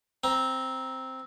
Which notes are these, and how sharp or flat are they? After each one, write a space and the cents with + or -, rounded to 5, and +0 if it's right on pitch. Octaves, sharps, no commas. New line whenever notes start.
C4 +0 A#5 +10